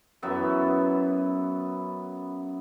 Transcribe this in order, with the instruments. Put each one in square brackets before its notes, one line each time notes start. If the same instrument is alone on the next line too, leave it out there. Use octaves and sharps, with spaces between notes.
[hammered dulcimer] F#2 E3 B3 E5